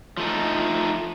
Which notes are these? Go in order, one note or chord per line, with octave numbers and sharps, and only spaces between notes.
F3 A3 D#4